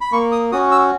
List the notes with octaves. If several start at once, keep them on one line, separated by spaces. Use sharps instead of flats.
B5
A#3 C#6
D#6
C#4 F#4 D#6
E6